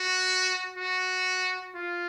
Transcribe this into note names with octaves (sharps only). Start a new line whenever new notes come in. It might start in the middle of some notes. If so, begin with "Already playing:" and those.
Already playing: F#4
F#4
F4